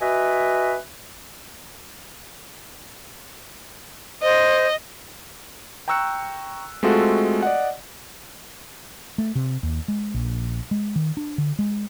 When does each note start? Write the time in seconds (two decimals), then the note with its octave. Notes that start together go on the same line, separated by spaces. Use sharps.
0.01 F#4 B4 D#5 E5 G#5
4.23 C5 D#5
5.88 G5 A#5 C#6 E6 F#6 C#7
6.83 G#3 A3 C4 F4 F#4 A4
7.43 D5 D#5 F#5
9.18 A3
9.35 C3
9.63 D#2
9.88 G#3
10.14 A#1
10.71 G#3
10.96 D#3
11.17 D4
11.38 D3
11.59 G#3